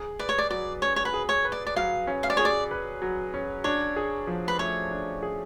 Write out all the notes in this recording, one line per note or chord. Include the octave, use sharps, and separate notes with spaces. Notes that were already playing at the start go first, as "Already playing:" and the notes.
Already playing: G#4
B4 D5
C#5
D5
F#3 D5
C#4 C#5
C#5
B4
G#4
C#5
B4
D5
D5
F#3 F5
C#4
F5
D5
G#4 C#5
D5
B4
F#3
C#4
D4 C#5
G#4
F3
B4
A3 C#5
D4
G#4